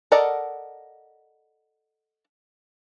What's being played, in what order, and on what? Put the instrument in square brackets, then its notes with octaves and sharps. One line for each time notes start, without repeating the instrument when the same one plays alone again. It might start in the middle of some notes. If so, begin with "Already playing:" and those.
[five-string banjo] A4 A#4 D5 D#5 F#5